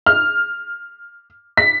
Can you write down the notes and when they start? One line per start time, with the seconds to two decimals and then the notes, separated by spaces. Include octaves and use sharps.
0.06 F6
1.57 B6